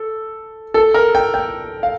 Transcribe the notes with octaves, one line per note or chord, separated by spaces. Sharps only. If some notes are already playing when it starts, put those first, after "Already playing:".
Already playing: A4
A4
A#4
G5
G5
F5